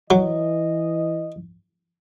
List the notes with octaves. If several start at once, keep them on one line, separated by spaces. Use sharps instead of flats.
E3 F#3 D#5